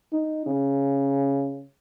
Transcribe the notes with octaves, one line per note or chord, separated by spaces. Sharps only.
D#4
C#3